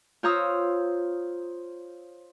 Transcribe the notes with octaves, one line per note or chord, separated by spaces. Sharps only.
F4 C5 C#5 A#5 D#6 E6